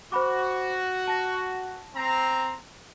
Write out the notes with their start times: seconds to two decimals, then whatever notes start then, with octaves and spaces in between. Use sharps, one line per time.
0.12 F#4 C5 B5 D6
1.07 A5 A#6
1.94 C4 A#5